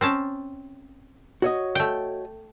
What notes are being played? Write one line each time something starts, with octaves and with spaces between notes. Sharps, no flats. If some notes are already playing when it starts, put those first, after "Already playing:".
C4 C#4 A5
F#4 C#5 D#5
A3 G5